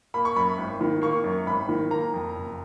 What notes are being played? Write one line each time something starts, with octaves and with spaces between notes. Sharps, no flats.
A#3 B5
C#6
F#2 B5
G#1
D#3
A#3 C#6
F#2
G#1 B5
D#3
A#3 A#5
F2
F#1